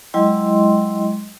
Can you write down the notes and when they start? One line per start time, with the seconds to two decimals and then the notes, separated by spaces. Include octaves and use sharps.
0.14 F#3 G#3 E4 D#5 G5 C6